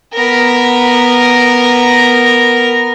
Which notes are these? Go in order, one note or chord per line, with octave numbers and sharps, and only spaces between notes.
B3 A#4